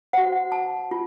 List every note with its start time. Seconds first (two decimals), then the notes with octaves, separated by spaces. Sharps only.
0.13 F#4 C5 F#5
0.52 A5
0.91 F4